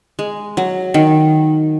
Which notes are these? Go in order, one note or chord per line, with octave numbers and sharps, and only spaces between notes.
G#3
F#3
D#3